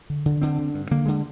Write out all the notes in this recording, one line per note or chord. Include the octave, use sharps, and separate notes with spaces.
D3
D3
D3 C4
D3
G2
D3 A#3
D3 G#3